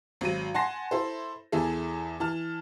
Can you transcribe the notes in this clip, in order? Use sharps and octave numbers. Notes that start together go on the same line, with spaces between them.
G#1 F#3 D#7
F#5 G#5 A5 C6 A#6 C7
E4 A4 C5
E2 E3 E4 G#4 A4
E3 A5 F6